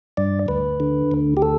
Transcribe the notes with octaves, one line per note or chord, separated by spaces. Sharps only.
G2 D5
D2 B4
D3
D2
G4
A4